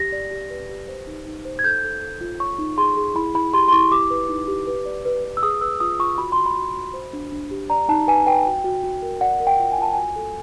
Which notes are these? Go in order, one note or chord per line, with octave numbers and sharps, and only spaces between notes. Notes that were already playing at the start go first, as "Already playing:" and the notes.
Already playing: G4 A#6
D5
G4
B4
G4
C5
D#4
D#4
C5
G#6
A4 G6
A4
A4
F4
C#5 C#6
D#4
G#4 C6
G#4
E4 B5
E4 B5
G4 C6
C6
E4 C#6
G4 D6
B4
D#4
G4
B4
D5
B4
B4
E6
G#4 D#6
B4 E6
F4 D#6
F4 C#6
F#4 B5
C6
F#4
B5
F#4
F#4
C5
D4
D4
G4
D5 A#5
D#4 A5
B4 G#5
B4 G5
F#4
F#4
F#4
A#4
D5 F#5
A#4
G5
F4
G#5
F4 A5
F#4 G#5
A4